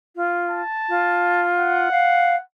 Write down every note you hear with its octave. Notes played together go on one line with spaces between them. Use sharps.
F4
A5
F4
F#5
F5